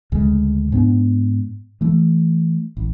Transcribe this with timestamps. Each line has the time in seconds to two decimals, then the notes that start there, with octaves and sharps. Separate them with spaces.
0.12 D2 C#3 G#3
0.72 G#2 B3 D4
1.81 E3 A3
2.77 A1